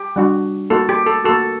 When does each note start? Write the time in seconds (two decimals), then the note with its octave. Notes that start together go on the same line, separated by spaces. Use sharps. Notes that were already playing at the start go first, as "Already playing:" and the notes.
Already playing: G4
0.16 G3 D4 F#4
0.70 A#3 D#4 F#4 A4
0.89 G4
1.06 A4
1.24 A#3 F#4 A4